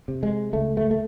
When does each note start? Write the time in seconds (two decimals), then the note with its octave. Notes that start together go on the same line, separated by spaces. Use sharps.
0.08 C3
0.23 G#3
0.53 C#2 A3
0.77 A3
0.91 A3